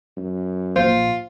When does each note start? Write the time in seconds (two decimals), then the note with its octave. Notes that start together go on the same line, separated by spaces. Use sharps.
0.17 F#2
0.76 A#1 A#2 F4 C5